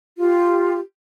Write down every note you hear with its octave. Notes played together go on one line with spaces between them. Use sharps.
F4 G4